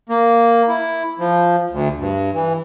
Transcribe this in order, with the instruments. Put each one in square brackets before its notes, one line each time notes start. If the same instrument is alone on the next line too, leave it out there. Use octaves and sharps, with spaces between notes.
[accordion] A#3
E4
F3
D2
G2
E3